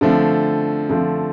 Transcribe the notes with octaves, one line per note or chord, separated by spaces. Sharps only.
D3 F3 A3 C4
D3 F3 A3 C4